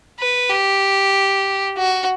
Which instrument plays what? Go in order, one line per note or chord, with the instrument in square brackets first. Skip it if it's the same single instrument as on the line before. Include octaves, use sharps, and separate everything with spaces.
[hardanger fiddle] B4
G4
F#4